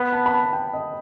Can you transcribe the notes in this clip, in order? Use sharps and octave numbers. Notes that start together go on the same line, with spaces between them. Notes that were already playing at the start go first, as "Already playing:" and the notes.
Already playing: B3 B5
A5
B5
A5
G5
D#5